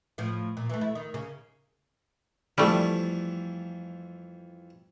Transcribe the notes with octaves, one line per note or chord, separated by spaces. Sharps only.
A2 F3
A#2
E3 A3
A3 E4
D#3
C#3 A#3
F2 E3 F3 G3 A3